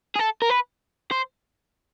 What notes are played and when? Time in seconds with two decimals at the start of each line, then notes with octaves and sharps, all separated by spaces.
0.15 G#4
0.19 A4
0.42 A#4
0.50 B4
1.11 C5